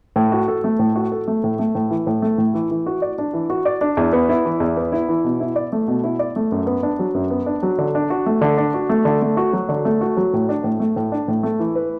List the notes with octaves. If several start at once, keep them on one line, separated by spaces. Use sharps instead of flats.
A2
F#4
A4
A3
A2
F#4
A4
A3
A2
A3
A2
E3
A2
A3
A2
E3
E3
F#4
D5
D4
E3
F#4
D5
D4
E2
B3
E4
E3
E2
B3
E4
E3
B2
E4
D5
A3
B2
E4
D5
A3
F#2
B3
D4
F#3
F#2
B3
D4
F#3
D3
D4
F#4
A3
D3
D4
F#4
A3
D3
A3
F#4
F#3
D3
A3
F#4
F#3
A2
D4
A2
A3
A2
D4
A2
A3
E3
B4